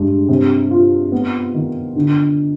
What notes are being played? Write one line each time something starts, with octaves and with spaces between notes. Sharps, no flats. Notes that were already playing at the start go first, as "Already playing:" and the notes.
Already playing: G2 G#3
C3
F4
B3
D#3
D3